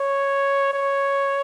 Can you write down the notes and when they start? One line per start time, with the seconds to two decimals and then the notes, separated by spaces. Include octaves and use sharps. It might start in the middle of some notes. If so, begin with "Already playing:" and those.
Already playing: C#5
0.73 C#5